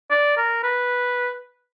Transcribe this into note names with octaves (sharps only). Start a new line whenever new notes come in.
D5
A#4
B4